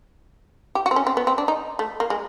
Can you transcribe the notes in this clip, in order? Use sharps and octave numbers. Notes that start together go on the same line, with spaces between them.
G4
F#4
C4
C#4
C4
B3
C4
D4
D#4
A3
A#3
G#3